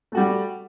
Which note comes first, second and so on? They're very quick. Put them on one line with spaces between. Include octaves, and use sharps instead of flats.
A3 F#4 G3